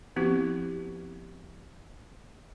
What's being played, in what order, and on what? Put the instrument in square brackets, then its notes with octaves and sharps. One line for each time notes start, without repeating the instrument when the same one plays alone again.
[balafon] F3 B3 C4 E4 F#4 G4